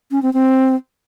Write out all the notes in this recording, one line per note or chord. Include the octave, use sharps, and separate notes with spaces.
C#4
C4
C4